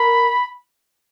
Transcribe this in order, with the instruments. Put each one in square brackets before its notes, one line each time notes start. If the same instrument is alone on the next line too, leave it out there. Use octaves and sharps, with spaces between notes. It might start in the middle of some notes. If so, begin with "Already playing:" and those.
Already playing: [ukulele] A#4 [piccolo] B5